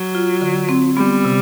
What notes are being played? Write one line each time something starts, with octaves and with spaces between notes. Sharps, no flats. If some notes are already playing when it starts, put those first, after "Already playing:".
Already playing: F#3
F4
D3
C4
G3 B3
C3